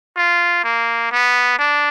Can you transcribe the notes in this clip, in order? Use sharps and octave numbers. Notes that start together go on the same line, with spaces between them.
F4
A#3
B3
D4